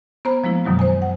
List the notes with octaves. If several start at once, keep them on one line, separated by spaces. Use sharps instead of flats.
B3 C5 A#5
F3 G#3 A#3 E4
F#2 B2 D#3 F#3 G#3
C5 G#5
F#5